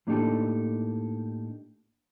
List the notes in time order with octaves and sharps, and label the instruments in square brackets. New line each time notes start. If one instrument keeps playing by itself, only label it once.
[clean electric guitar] A2 A#3 D4 D#4 G4 A4